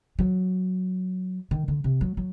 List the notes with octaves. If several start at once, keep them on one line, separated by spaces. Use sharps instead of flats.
F#3
D#3
D3
C3
F#3
F#3